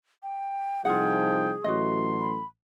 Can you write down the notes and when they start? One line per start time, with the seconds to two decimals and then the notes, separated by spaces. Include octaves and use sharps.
0.23 G5
0.85 C2 F3 D#4 F4 G#4 F#5 G5
1.64 A1 F#3 A3 F#4 D#5 C6
2.20 B5